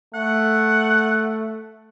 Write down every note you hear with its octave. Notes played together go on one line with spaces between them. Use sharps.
A3 F#5